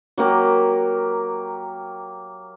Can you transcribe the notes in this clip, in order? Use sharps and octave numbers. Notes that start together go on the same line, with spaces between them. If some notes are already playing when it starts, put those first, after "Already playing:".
F#3 A#3 G4